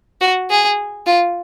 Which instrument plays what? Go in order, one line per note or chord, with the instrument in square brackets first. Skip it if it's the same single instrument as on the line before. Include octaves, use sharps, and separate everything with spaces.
[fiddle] F#4
G#4
F4